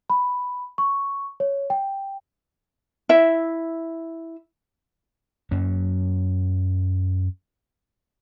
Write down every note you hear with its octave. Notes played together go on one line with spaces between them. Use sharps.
B5
C#6
C#5
G5
E4 E5
F#2 F#3 A#3 C#4